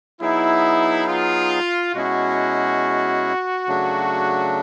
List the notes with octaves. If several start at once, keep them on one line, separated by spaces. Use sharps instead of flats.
F#3 B3 D#4 E4 G#4
F4
B2 G#3 C#4 E4 F#4 G#4
C#3 F#3 A3 D4